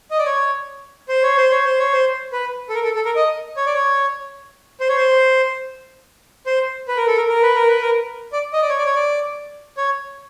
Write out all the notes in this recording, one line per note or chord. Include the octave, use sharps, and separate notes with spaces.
D#5
D5
C#5
C5
C#5
C5
C#5
C5
C#5
C5
B4
A4
A#4
A4
A4
A#4
D#5
C#5
D5
C#5
C5
C#5
C5
C5
B4
A#4
A4
A#4
A#4
B4
A#4
B4
A#4
D5
D#5
D5
C#5
D5
C#5
D5
C#5